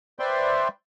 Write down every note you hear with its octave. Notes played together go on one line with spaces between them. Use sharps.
B4 C5 D5 E5 G5 C6